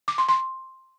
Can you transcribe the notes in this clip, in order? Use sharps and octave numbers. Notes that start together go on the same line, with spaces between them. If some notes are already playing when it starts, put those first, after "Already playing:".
D6
C6
C6